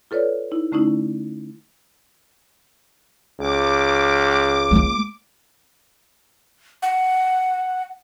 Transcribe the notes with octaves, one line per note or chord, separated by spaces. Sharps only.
F4 A4 B4 C#5 D5
D#4 E4
D3 A3 C#4 D#4 E4
C#2 D6
G#3 A#3
F#5